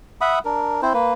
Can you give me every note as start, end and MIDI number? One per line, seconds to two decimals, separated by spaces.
0.21 0.39 76
0.21 0.39 78
0.21 0.39 83
0.21 0.39 87
0.45 0.81 62
0.45 0.81 70
0.82 0.93 60
0.82 0.93 64
0.82 0.93 72
0.94 1.14 58
0.94 1.14 71